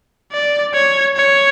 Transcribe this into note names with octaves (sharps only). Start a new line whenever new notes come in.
D5
C#5
C#5